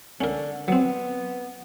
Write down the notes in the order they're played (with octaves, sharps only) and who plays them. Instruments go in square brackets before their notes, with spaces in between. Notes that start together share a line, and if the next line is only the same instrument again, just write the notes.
[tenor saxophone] D3 [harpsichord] C#4 A#4
[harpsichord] F#3 C4 [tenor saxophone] B3